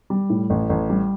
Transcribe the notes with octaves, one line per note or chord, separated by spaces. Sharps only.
G3
A2
A1
A1
G3